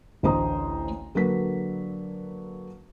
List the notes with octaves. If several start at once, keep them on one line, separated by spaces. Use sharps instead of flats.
A1 D2 C5 D#5 A#5 D#6
D3 F#3 A#3 D4 B4 B6